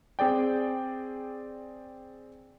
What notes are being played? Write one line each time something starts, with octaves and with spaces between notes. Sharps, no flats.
C4 G#4 D5 G5